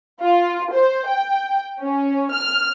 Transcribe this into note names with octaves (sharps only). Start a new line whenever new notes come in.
F4
C5
G5
C#4
F6